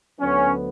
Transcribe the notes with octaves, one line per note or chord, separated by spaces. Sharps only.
D2 D3 F#3 B3 C#4